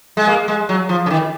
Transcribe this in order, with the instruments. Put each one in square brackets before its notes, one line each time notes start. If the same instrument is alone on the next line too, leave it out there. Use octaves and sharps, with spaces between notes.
[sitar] G#3
A#3
G#3
F#3
F3
C#3
D#3